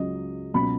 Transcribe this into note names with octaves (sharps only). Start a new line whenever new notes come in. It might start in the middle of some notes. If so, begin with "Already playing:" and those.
Already playing: C#2 C#3 F#3 D#5
C#2 B2 F#3 B5